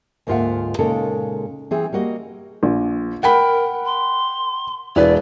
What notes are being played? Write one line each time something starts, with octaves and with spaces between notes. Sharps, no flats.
D2 G#2 A#3 F4 E5 F#5
A#2 C#3 G#3 D#4 A4 A#4
E3 C4 G#4
G3 A#3 F#4 D#5
A#1
A#4 F#5 G5 B5
C6
E1 E4 B4 D5